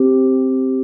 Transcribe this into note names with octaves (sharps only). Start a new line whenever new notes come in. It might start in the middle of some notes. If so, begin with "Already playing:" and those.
Already playing: C4 G4